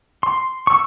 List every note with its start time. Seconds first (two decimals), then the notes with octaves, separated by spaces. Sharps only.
0.23 C6
0.67 C#6 E6